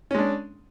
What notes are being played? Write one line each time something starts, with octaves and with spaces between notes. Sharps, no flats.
G#3 C#4 D4